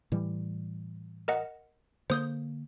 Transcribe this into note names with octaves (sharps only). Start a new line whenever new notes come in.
A2 E3 G3
A#4 D#5 F#5
D3 A#3 C5 D#6 G6